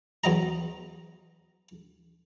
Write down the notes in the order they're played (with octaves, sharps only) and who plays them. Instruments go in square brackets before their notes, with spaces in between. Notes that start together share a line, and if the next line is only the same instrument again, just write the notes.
[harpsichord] E2 F#3 D#5 A#5